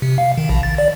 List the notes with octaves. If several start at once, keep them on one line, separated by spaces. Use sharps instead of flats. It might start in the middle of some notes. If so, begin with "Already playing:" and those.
C3
F5
D#3
A#1
A6
D5